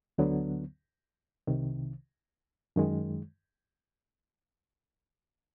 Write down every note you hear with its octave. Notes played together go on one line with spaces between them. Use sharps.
D2 D3 F#3 B3
C2 C3 D#3
F#2 D#3 G#3